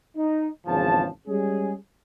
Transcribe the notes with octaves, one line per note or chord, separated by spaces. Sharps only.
D#4
G#1 E2 C#3 F3 A5
G3 G#3 C#4 G#4